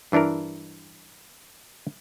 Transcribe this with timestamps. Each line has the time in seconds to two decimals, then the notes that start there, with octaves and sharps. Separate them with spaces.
0.12 G2 E3 D4 E4 A#4